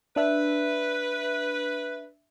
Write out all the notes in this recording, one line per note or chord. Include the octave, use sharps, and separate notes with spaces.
D4 B4 E5